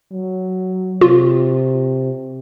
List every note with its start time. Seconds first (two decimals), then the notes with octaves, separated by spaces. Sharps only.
0.12 F#3
1.01 C3 F4